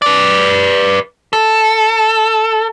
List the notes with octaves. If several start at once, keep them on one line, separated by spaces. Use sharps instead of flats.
B4 D5
A4